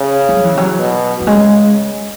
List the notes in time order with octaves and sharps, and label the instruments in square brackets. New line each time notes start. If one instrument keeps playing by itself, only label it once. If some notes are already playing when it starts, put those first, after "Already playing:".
Already playing: [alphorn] C#3
[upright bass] F#3
E3
F#3
[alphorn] B2
[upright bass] F#3
[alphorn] C#3 [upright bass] G#3